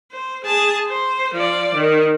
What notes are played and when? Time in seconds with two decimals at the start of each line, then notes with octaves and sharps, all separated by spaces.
0.12 C5
0.44 G#4 A5
0.87 C5
1.34 F3 D5
1.74 D#3